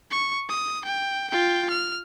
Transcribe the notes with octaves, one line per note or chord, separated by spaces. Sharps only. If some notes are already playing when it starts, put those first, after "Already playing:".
C#6
D#6
G5
F4 G5
F6